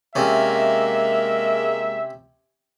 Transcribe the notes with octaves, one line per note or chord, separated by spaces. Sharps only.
C3 G#3 A#3 C#4 E5